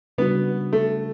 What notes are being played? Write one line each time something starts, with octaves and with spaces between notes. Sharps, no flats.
C#3 G3 B3 D4 F#4
A3